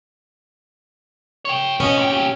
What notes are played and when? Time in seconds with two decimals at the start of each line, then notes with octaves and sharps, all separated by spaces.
1.45 C#5 G5
1.80 B3 C#4 D#5
1.98 A#2 G5
2.10 A#2 G4